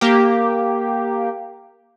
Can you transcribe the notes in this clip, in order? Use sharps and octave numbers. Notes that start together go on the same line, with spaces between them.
A#3 G4